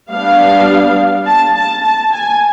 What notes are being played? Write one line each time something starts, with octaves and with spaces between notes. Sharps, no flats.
G3 B3 D4 F5
A5
A5
A5
G#5